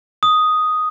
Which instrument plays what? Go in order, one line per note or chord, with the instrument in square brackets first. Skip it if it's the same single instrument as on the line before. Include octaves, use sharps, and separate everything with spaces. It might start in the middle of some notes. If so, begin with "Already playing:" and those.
[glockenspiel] D#6